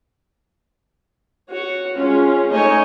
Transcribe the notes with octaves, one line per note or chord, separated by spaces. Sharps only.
F#4 C#5
G#3 C#4 F4
A3 D#4 C#5 D#5 G#5